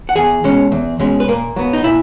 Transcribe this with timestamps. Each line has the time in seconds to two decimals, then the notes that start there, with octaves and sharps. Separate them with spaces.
0.09 F#5
0.15 E2 G#4 G#5
0.44 B2 G#3 C#4
0.72 E2
0.99 B2 G#3 C#4
1.20 B4
1.28 A#2 A#3 A#4
1.56 F#3 B3
1.73 D#4
1.84 A#2 E4